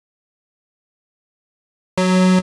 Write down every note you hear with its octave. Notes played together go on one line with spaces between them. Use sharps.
F#3